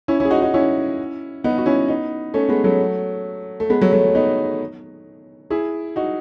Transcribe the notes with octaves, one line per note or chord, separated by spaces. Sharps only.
C#4 E4
C#4 E4
G#4
D#4 F#4
D#4 F#4
C#4 E4
B3 D#4
F#4
C#4 E4
B3 D#4
A3 C#4
G#3 B3
F#3 A3
A3
G#3 B3
F#3 A3
F#3 A3
G#3
B3 D#4
E4 G#4
D#4 F#4